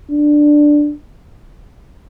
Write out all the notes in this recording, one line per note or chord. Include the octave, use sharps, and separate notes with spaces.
D4